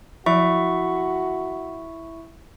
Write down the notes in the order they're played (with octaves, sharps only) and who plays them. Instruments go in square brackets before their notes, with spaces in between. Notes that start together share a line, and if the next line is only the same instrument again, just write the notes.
[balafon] F3 F#3 [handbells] E4 E5 C#6 [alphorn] F#4